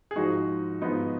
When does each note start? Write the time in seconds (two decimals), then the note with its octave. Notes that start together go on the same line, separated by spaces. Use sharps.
0.11 G#4
0.16 G#2 F3 D#4 F#4
0.81 G#2 F3 B3 D#4